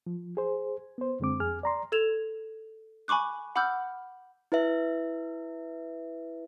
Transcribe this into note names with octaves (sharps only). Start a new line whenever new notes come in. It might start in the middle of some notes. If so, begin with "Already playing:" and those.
F3
G#4 C5
B3 C5
F#2 D3 G#3 C4 D6
F2 G#4 G#5 F6
D5 A#5 C6
A4 G#6 E7 F7
G#5 B5 C#6 D6 F#6
F#5 B5 D6 E6 F6 G6
E4 B4 E5